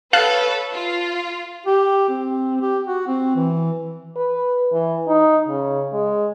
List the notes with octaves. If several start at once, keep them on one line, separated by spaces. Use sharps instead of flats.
A4 B4 C#5 F5 A5 F#6
F4
G4
C4
G4
F#4
C4
E3
B4
E3
D#4
C#3
G#3